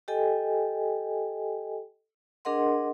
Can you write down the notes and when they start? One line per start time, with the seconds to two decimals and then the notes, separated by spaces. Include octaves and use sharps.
0.08 G4 A4 D#5 G5 G#5
2.45 D4 G#4 A#4 D#5 F#5 C6